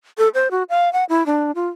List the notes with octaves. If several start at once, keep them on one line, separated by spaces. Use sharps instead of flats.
A4
C5
F#4
F5
F#5
E4
D4
F4